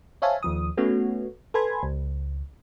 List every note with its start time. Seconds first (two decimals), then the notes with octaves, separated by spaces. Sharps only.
0.22 C5 C#5 E5 F5 G#5 A5
0.43 D#2 F3 D#6
0.77 A3 B3 C#4 F#4
1.54 A4 B4 G#5 B5 C6 G#6
1.83 C#2